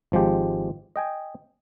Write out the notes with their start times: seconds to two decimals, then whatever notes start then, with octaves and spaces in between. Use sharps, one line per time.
0.12 G#1 F3 G#3 G4
0.96 D#5 G5 G#5